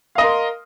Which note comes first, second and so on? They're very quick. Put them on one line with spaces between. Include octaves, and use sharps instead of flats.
F5 D#5 A#4 C6